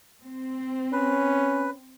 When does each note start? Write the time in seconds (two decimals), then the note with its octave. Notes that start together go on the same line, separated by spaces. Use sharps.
0.21 C4
0.93 C#4 B4